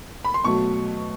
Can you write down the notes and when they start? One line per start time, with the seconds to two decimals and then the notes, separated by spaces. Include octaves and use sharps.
0.25 B5
0.34 C6
0.44 B2 F#3 A3 C#6